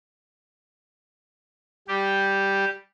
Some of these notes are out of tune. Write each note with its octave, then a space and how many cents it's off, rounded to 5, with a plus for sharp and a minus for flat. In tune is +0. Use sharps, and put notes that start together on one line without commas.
G3 +0 G4 +0